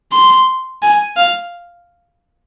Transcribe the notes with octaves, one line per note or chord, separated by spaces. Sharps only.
C6
G#5
F5